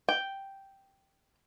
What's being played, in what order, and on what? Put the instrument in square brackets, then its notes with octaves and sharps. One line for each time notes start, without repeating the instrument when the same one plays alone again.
[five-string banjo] G5